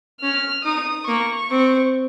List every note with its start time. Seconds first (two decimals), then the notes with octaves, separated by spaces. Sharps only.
0.22 C#4 F6
0.65 D#4 D#6
1.07 A#3 C#6
1.50 C4